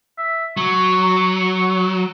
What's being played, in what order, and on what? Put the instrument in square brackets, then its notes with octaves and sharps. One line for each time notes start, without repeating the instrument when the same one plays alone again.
[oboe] E5
[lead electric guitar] F#3 [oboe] C#6